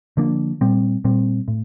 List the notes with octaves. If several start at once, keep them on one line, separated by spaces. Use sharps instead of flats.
D3 F3 A#3 D4
A#2 G3 C4
A#2 G3 C4
A2